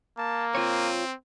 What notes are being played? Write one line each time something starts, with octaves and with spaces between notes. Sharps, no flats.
A#3 A5
C4 F4 C#5